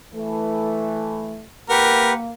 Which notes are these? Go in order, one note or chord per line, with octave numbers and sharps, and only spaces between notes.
E3 A3
A#3 G4 A#4 B4 F#5